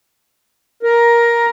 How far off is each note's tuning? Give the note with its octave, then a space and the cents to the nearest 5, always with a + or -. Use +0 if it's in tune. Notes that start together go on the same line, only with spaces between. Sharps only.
A#4 +10